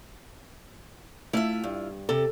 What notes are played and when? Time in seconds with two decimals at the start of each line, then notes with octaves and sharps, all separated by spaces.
1.33 A3 E4 F4 E5
1.64 G2
2.09 C3 A4